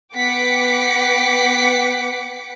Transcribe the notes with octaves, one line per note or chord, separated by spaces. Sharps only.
B3 F#5 G5 D6 B6 C#7